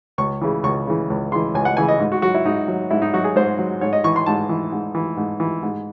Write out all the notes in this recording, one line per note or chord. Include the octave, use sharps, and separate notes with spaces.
C#2 C#6
C#3 E3
C#2 C#6
C#3 E3
C#2
C#3 E3 C6
C#2 G#5
F#5
C#3 E3 G#5
D#5
G#2
F#4
F#3 F#4
E4
G#2 D#4
F#3
G#2 E4
D#4
F#3 F#4
G#4
G#2 C5
F#3
G#2 C#5
D#5
E3 C#6
C6
G#2 A5
E3
G#2
E3
G#2
E3
G#2